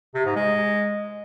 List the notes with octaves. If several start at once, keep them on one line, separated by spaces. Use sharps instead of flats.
C3
G#2
G#3